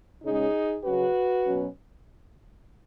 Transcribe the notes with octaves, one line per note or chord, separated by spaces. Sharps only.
C#3 G#3 C#4 D#4 G#4
C#3 F#3 C#4 F#4 B4
B2 F#3 C#4